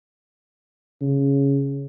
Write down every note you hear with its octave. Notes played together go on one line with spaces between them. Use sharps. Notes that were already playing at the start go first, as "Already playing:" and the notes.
C#3